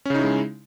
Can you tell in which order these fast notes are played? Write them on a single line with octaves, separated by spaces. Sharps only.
C#4 C#3 D#4 E4 G#3